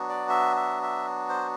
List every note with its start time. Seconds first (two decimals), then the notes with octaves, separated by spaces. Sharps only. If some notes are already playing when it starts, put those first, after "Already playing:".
Already playing: F#3 B3 D4 F#4
0.09 D5
0.29 E5
0.56 E5
0.83 E5
1.29 C5